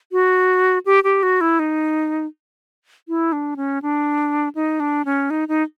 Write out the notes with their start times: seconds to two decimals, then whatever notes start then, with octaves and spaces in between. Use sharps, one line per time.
0.12 F#4
0.86 G4
1.04 G4
1.23 F#4
1.41 E4
1.59 D#4
3.08 E4
3.32 D4
3.57 C#4
3.82 D4
4.55 D#4
4.80 D4
5.05 C#4
5.30 D#4
5.48 D#4